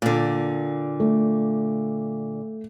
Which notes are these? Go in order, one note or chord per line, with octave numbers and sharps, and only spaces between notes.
A#2 D3
A3